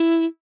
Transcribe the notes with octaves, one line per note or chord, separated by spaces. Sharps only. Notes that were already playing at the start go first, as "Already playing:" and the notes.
Already playing: E4